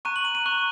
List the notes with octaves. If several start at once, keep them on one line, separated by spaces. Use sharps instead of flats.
A#5 C#6 F#6 D#7
F#7
D#7
D#7
A#5 C#6 F#6